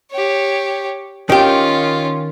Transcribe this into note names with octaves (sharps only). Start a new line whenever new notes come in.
G4 C#5
D#3 C#4 F4 G4